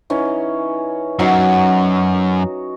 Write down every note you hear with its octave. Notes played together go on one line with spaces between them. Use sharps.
E3 C#4 D#4
F#2 F#3 D#4 F#4